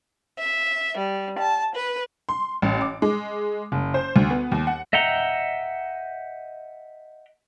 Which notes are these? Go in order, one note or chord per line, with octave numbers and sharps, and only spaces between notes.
E5
G3
A5
B4
C6
A1
D6
G#3
F#1
C5
D2
B3
D#2
F#5
D#5 E5 F#5 G5 A#5